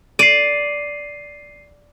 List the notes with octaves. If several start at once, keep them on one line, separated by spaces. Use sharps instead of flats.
D5 C7 D#7